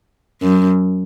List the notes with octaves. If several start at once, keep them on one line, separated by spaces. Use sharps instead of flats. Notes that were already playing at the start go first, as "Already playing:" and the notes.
F#2